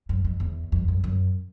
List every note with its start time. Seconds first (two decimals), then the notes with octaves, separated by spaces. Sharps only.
0.09 F#2
0.25 F2
0.40 E2
0.72 F2
0.88 F#2
1.04 F#2